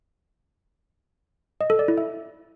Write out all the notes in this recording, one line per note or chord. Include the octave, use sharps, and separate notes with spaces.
D#5
A4
D5
E4
E5